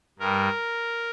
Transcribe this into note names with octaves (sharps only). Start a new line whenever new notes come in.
G2 G3 A#4